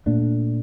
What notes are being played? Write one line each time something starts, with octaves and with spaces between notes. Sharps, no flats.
A#2 A3 D4